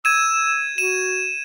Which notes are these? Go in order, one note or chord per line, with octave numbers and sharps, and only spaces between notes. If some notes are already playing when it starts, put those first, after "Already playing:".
E6 G#6 D#7 E7
F#4 D#7 E7